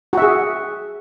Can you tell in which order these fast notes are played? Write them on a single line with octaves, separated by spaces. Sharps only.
F#4 E5 G#4